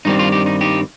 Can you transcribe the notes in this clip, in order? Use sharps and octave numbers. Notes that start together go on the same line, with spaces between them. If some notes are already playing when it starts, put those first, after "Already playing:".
G2 D#3 G3 C4 D#4
F4
D#4 G4
D#4
D#4 G4